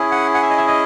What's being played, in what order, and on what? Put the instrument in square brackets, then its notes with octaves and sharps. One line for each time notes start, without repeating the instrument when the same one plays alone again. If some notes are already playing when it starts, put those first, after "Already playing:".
Already playing: [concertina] C#4 E4 G#4
F#5
F#5
E5
D#5
E5
D#5